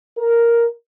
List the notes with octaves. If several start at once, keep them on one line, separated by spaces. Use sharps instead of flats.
A#4